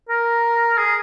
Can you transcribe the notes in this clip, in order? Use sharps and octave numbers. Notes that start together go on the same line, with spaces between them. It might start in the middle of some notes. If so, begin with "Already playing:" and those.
A#4
G#4